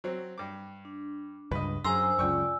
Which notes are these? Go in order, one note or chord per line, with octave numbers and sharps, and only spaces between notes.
F#3 C4
G2 D6
D4
C#2 G2 B4 D#5
F#2 D4 G#4 C5 G#5 A#5 C6 E6
C#2 F#2 C#4 F4 D5 G5 C#6